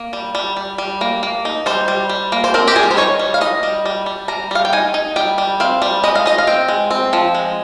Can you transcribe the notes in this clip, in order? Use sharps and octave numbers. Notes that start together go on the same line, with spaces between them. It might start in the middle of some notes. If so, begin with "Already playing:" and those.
Already playing: A#3
G3
G3
G3
G3
A#3
A#3
D#4
G3 C5
G3
G3
A#3
C5
C4 A#4
G4
G3 G#4
A#4
C5
D#4 C#5
G3
F5
D#4 D#5
G3
G3
G3
G3 A#5
G3 F5
G5
D#4 G#5
D#4
G3 G5
G3
C4 F5
G3
G#3 D#5
F5
D#4 D#5
F5
C4 G5
G#3
C4
F3
G#3